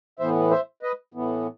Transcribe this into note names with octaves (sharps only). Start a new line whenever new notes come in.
A2 E3 B3 C5 E5
C5 E5
B4 D#5
A2 E3 B3